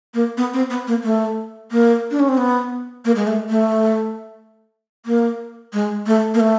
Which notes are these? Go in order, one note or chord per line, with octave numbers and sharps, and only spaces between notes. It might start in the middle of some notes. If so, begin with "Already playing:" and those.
A#3
B3
C4
B3
A#3
A3
A#3
D4
C#4
C4
B3
A#3
G#3
A3
A3
A#3
G#3
A3
A#3
A3